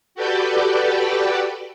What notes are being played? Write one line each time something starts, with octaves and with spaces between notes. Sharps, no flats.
F#4 G4 A4 B4 D5 G5